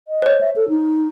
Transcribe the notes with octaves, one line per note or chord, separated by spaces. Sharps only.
D#5
C5 C#5
E5
A4
D#4